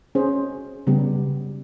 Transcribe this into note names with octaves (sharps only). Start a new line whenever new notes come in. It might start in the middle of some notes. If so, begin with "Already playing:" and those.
C#4 G#4 C5
C#3 G3 B3 G4